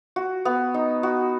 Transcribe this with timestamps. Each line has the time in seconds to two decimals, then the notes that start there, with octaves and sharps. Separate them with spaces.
0.16 F#4
0.45 B3
0.74 D#4
1.03 F#4